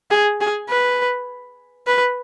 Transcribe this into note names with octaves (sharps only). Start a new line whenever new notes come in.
G#4
G#4
B4
B4